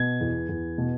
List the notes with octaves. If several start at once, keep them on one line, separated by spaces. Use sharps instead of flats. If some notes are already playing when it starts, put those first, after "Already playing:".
Already playing: B2 G#6
E2
E2
B2